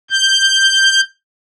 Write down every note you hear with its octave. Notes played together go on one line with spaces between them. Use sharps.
G6